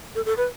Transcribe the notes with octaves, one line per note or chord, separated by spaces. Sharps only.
A4
A4
B4